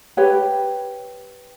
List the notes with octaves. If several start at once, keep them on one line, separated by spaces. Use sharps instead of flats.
G4 B4 C#5 G5